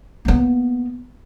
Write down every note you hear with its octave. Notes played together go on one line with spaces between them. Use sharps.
A#3 B3